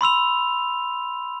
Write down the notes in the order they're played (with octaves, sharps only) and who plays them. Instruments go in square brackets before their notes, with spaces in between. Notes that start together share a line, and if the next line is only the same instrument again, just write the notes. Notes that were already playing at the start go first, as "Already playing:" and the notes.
[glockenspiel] B5 C6 E6 F7